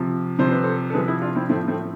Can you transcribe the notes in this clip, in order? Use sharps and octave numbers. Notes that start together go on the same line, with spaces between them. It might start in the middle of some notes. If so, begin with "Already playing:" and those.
Already playing: C3 F3
C3 F3 C5
B4
A4 C5
A4
C3 F3 G#4 B4
E4 G#4
D4 F4
C4 E4
A2 F3 A3 C4
A3 C4